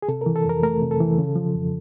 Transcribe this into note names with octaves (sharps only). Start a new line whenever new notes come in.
G#4
C3 A4
E3 A#4
A4
F2 A#4
A3 A#4
C3
A4
E3
C#3
F3
F2